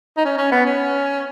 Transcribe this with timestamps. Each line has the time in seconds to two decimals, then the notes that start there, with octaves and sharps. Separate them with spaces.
0.17 D#4
0.25 C#4
0.38 C#4
0.52 B3
0.66 C#4